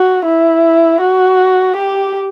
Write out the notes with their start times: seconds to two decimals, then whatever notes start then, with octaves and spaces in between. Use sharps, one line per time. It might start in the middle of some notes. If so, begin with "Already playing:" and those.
Already playing: F#4
0.25 E4
1.01 F#4
1.77 G4